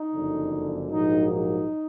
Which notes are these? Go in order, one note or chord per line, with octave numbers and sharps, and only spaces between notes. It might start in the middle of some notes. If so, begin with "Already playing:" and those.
Already playing: D#4
F#1 F2 D3
A#1 G#2 F#3 A#3 D#4
D#4